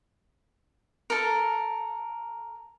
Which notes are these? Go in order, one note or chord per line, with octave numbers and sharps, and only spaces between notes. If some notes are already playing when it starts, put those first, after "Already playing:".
A4 A#4